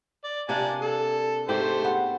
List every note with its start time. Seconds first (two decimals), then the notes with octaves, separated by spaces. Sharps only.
0.24 D5
0.49 C3 A#3 D4 D5 G#5
0.82 A4
1.49 G#2 A3 C4 G4 C5
1.84 B3